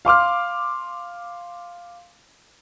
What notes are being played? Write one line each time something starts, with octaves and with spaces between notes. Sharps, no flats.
F5 C6 D6 F6